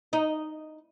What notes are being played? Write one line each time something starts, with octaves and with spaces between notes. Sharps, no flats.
D#4